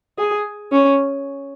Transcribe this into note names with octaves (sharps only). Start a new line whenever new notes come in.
G#4
C#4